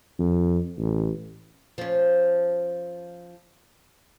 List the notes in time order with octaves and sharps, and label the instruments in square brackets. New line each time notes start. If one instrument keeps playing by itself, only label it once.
[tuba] F2
A1
[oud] F3 C#4